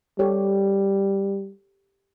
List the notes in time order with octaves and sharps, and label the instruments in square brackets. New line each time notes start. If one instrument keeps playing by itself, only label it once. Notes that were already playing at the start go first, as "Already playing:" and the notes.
[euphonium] G3 [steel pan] G4 A4 C#5